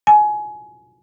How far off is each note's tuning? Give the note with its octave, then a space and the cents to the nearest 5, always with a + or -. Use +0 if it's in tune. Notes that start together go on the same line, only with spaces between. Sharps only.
G#5 +20